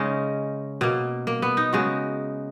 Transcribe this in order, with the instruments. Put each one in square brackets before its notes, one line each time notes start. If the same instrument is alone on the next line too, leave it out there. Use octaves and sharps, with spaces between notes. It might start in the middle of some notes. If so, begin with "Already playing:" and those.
Already playing: [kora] C#3 G#3 C#4 D#4
B2 A#3
A#3
B3
D#4
C#3 G#3 F#4